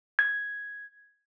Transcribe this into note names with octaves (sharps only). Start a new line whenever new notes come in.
G#6